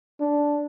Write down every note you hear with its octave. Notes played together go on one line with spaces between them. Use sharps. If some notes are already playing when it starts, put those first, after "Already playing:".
D4